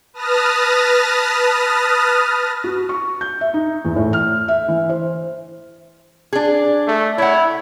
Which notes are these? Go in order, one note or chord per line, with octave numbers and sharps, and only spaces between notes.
B4 A5 D#6 F6 A#6
F#4
C#6
G6
E5
D#4
E2
A2
F6
E5
E3
C5
D4 G#4
A3
E4 C#5 F#5